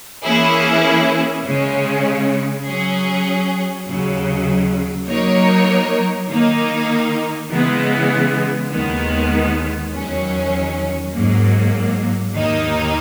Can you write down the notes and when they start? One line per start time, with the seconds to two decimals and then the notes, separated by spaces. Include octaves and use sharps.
0.23 E3 A#3 C#4 E4 G#4
1.45 C#3 G#3 C#4
2.65 F#3 C#4 G#4
3.86 D#2 C#3 F#3
5.08 F#3 A#3 D#4 A#4 C#5
6.29 D#3 A#3 D#4
7.50 C#3 E3 G#3 B3
8.71 D#2 D#3 G#3 B3
9.92 E2 D#3 F#3 C#4
11.13 G#2 F#3 A#3
12.34 D#2 D#3 A#3 D#4